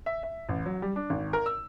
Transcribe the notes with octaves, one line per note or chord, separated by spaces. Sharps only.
E5
E5
A1
F#3
G3
D4
G#1
A#4
E6